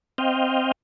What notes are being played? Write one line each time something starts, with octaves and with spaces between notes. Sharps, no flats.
C4 D#5 F5 G5